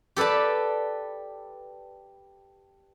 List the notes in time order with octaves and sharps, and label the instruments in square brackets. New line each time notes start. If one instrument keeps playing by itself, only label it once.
[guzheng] G4 A4 B4 D5 A5